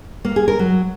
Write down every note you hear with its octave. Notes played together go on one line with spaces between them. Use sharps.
A#3
G#4
A#4
F#3